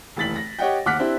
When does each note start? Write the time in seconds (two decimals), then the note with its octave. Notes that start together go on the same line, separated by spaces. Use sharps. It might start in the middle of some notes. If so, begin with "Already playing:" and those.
0.16 F1 D#2 E3 A6 B6 F#7
0.36 A#6
0.59 G4 C#5 D#5 F#5 G5
0.86 D#2 F#5 D6 F6 F#6 B6
0.99 C4 D4 E4 G4 C5